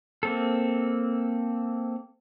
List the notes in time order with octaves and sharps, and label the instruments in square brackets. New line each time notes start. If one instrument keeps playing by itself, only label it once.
[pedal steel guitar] A#3 C4 A4